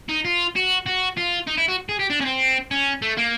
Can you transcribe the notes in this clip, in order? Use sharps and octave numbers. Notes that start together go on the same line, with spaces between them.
D#4
F4
F#4
F#4
F4
D#4
E4
F#4
G#4
G4
D4
C#4
C4
C#4
A3
A#3